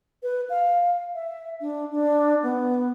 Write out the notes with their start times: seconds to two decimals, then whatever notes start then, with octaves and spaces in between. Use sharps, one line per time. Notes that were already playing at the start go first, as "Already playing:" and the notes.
0.23 B4
0.50 F5
1.15 E5
1.61 D4
1.91 D4
2.43 B3